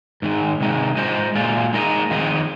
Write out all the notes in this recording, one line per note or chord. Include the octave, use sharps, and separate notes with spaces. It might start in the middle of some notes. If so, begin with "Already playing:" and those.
G#2 D#3 G#3
C3 D#3 G#3
G#3 F4 C5 D#5
A#2 G#3 F4
G#3 D#4 A#4 D#5
F2 D#3 C4 G#4 D#5